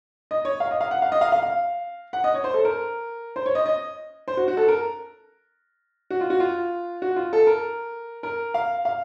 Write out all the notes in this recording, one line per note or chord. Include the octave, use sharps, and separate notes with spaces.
D#5
C#5
F5
D#5
F5
F#5
F5
D#5
F5
F5
F5
F#5
D#5
C#5
C5
A4
A#4
C5
C#5
D#5
D#5
C5
F#4
F#4
A4
A#4
F#4
F4
F#4
F4
F#4
F4
A4
A#4
A#4
F5
F5